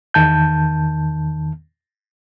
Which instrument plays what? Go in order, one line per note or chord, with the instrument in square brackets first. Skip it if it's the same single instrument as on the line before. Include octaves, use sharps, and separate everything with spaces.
[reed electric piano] E2 D#3 A5 G6